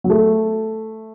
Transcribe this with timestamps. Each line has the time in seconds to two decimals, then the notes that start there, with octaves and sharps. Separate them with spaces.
0.04 F#3
0.10 A3